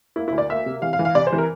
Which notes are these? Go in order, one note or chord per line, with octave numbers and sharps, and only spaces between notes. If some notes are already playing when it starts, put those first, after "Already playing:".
A#3 E4
E4
D2
D5
A#3 E5
C3
E3 F5
F5
E3
F5
C3 D5
C5
E3
A#4